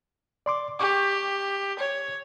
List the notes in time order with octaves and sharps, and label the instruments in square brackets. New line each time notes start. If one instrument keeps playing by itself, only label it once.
[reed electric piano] D5 C6 D6
[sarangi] G4 [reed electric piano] C#6 D6
[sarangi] C#5